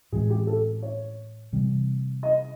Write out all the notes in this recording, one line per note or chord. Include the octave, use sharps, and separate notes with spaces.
A2 E3 G#3 C4 G#4
G4
A4
C#5
C3 E3 G3 C4
D#5